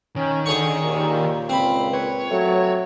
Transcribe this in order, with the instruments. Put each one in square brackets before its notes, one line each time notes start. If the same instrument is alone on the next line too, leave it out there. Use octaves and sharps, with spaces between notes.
[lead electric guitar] D#3 [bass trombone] C#4
[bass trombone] D3 [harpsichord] G#4 C#5 C#6
[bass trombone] D#2 [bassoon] A#2
[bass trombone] C#2 [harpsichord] C4 B5
[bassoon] B4 [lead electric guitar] C#5
[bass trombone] F#3 [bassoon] A3